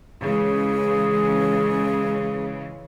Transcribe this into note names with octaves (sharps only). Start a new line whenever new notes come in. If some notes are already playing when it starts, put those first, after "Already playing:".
C#3 E3 G#3 G#4